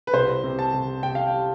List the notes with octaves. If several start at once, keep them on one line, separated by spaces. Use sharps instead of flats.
B4
C2 C5
C3
A5
C3
C3 G5
F5
G5
G3